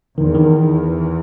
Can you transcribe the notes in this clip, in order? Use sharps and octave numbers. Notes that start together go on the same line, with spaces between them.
E2 D#3
D#3